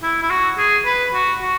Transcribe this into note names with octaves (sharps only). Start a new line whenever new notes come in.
E4
E4
F#4
G#4
B4
F#4
F#4